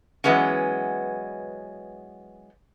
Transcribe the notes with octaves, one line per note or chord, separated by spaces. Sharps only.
E3 F#3 G#3 B3 C#4